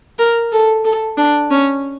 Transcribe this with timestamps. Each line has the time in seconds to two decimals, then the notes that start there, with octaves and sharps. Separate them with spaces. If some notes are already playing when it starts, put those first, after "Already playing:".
0.19 A#4
0.52 A4
0.85 A4
1.18 D4
1.51 C#4